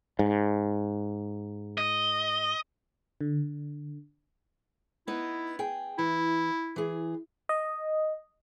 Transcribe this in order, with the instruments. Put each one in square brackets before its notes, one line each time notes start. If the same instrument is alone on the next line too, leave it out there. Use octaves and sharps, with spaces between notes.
[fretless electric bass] G#2
[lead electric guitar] D#5
[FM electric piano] D3
[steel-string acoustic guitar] B3 D#4 [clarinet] E4
[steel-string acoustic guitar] G#4 G5
[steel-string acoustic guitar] E3 [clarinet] E4
[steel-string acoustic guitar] E3 G#4
[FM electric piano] D#5